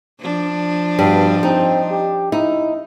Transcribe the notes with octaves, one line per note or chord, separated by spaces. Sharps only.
F3 D4
G2 B2
C4 D#4
G4
D#4 E4